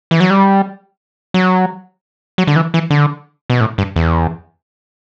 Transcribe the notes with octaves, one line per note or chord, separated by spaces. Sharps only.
E3
F#3
G3
F#3
F#3
D3
E3
E3
D3
B2
A2
G2
E2